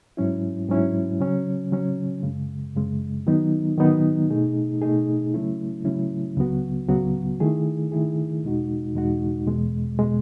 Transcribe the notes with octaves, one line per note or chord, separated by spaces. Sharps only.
G#2 F#3 C#4 E4
G#2 F#3 C#4 E4
C#3 F#3 C#4
C#3 F#3 C#4
F#2 C#3 G#3
F#2 C#3 G#3
D#3 F#3 B3 D#4
D#3 F#3 B3 D#4
B2 A3 D#4 G#4
B2 A3 D#4 G#4
C#3 F#3 A3 C#4 E4
C#3 F#3 A3 C#4 E4
C#2 C#3 F#3 B3 F#4
C#2 C#3 F#3 B3 F#4
D#3 A3 E4 G#4
D#3 A3 E4 G#4
E2 B2 G#3 D#4 F#4
E2 B2 G#3 D#4 F#4
E2 B2 G#3
B2 G#3